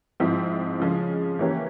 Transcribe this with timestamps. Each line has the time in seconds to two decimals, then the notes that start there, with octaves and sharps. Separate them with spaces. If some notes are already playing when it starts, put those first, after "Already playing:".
0.20 G#2 F3 C4 E4
0.80 C#3 F3 G#3
1.39 E3 A#3 C#4 G4